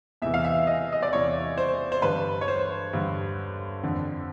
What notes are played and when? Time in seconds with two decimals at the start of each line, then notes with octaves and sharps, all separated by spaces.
0.22 E2 C3 E3 E5
0.34 F5
0.45 E5
0.67 D#5
0.92 D#5
1.03 D5
1.13 E2 C3 E3 C#5
1.58 C5
1.92 C5
2.02 G2 D3 B4
2.41 C#5
2.48 C5
2.93 G2 D3
3.83 F2 D3